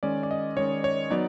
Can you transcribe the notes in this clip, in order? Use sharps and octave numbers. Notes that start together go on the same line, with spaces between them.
D#3 G#3 C#4 D5
D5
D#5
D#3 G#3 C#4 C#5
C#5
F#3 B3 D#4 D5